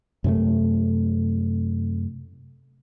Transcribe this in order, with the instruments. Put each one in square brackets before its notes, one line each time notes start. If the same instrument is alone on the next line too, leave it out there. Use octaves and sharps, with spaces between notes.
[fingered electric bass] F#2 C3 A3